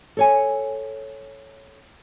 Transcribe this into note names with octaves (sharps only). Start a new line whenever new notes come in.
A4 C#5 G#5